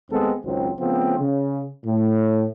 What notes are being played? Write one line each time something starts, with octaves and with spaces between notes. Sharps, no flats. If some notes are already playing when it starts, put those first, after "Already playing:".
D#2 G#3 B3 C4 A4
G#1 C#2 F#3 C4
C#3 F3 A3 B3 C4
C#3
A2